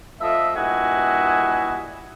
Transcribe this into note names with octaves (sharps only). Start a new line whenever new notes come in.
F3 A3 D#5 E5
G2 A#2 E4 F#4 D#5 G#5